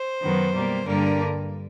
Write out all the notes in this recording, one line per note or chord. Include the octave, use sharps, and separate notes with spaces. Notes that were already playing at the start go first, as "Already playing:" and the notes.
Already playing: C5
F#2 D#3 F#3 B3
B2 G3 A#3
G2 D3 G3 A#3 A#4